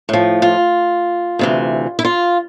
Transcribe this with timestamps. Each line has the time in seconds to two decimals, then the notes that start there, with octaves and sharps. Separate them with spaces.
0.09 A2 F3
0.42 F4
1.39 D2 C3 E3
1.99 E4
2.05 F4